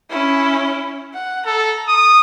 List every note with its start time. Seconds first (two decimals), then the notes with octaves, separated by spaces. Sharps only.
0.10 C#4 E4
1.14 F#5
1.46 A4 A#5
1.88 D#6